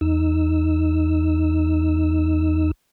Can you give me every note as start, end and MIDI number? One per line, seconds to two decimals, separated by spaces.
0.01 2.71 40
0.01 2.71 63
0.01 2.71 88